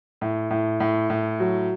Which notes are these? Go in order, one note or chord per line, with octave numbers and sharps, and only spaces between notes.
A2
A2
A2
A2
F#3